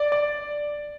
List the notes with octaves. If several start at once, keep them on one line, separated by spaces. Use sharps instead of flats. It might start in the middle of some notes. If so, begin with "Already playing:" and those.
Already playing: D5
D5